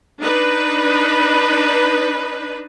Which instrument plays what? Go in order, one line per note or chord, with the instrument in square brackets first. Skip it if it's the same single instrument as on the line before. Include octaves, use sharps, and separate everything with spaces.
[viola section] D4 D#4 B4